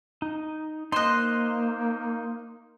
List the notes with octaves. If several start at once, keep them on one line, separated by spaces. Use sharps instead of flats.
D#4
A#3 D#4 C5 D#5 C6 F#6